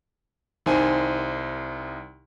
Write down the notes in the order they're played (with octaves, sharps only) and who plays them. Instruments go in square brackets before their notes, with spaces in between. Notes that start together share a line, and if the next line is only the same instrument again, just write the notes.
[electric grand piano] C2 D#3 C5 G#5